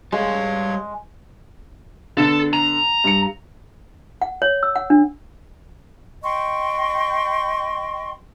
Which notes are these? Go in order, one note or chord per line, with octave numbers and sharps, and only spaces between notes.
G3 G#3 C#5 F5
D3 B3 A4
A#5
G2 C#7
F#5
C#5
E6
F#5
D4
D#5 G5 C6 C#6